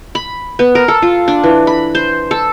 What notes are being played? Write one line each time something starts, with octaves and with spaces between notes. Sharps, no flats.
B5
B3
A#4
A4
F4
D4
E3
B5
C5
A4